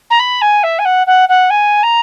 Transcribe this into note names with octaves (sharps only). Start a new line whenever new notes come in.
A#5
B5
G#5
E5
G#5
F#5
F#5
F#5
G#5
A#5